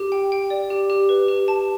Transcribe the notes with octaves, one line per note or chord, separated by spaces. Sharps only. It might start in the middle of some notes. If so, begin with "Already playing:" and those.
Already playing: G4
G5
G5
D5
G4
G4
B4
G4
A5